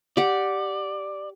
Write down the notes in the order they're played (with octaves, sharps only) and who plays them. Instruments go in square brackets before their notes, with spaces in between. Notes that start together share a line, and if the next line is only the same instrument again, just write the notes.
[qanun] G4 F#5 [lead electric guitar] D5